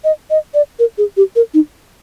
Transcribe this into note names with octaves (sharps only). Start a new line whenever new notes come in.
D#5
D#5
D5
A#4
G#4
G4
A#4
D#4